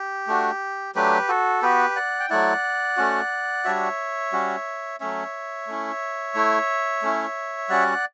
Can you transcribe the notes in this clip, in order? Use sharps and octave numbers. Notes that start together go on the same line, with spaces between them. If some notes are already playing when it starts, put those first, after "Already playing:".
Already playing: G4
A3 D4 F#4
F#3 A3 D4 G4 B4
F#4 A4
B3 F#4 G4 B4
D5 F#5
G5
F#3 A3 E4 D5 F#5
A3 C#4 F#4
G3 D4 F#4 C#5 E5
G3 C#4 F#4
F#3 A3 C#4 C#5 E5
A3 C#4 E4
A3 E4
A3 C#4 E4
G3 C#4 F#4 D5 F#5